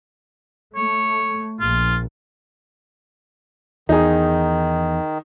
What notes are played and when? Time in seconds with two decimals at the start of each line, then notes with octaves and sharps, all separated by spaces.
0.76 A3 C#5
1.61 A#1 F4
3.89 E2 D#3 D#4 G#4